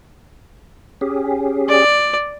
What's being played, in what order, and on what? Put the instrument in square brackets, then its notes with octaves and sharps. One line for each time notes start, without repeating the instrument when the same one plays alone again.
[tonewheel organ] C#4 G4 G#4
[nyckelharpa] D5